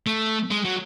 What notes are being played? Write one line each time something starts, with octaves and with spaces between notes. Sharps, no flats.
A3
G#3
F#3